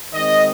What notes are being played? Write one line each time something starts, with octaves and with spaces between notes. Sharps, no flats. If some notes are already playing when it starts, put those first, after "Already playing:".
D#3 G#3 C4 D#5